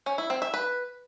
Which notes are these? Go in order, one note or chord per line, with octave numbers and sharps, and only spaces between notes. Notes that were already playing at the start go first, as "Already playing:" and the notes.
C#4
E4
C4
E5
B4